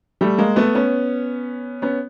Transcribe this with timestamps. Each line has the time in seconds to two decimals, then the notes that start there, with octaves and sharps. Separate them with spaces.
0.21 G3 A3
0.38 G#3 A#3
0.56 A3 B3
0.75 B3 C#4
1.82 B3 C#4